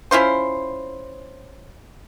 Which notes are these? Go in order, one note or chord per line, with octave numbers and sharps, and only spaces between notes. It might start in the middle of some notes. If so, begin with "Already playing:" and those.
C#4 E4 F4 C5